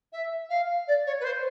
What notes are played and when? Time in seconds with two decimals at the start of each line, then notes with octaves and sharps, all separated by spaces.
0.13 E5
0.49 F5
0.87 D5
1.06 C#5
1.20 B4
1.24 C5